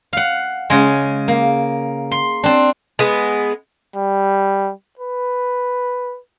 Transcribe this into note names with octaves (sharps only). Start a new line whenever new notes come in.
F5 F#5
C#3 G#3
A#3
C6
C4 D4
G#3 B3
G3
B4